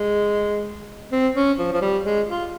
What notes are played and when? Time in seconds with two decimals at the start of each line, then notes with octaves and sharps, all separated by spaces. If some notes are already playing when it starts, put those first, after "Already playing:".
Already playing: G#3
1.12 C4
1.36 C#4
1.59 F3
1.73 F3
1.82 G3
2.05 G#3
2.29 F4